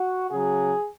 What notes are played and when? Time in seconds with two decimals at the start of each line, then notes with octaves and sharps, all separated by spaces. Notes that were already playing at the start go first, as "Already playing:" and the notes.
Already playing: F#4
0.30 C#3 F#3 G#4